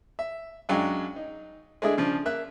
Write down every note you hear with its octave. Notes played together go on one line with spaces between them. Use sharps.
E5
F#2 F#3 G#3 D4 F5 G5
D#4
G#3 A3 D4 E4 G#4
C#3 F3 D4
A#3 E5 F#6